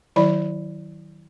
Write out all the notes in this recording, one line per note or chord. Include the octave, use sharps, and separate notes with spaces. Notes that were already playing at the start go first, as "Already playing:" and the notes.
D#3 F#3 E4 D5 B5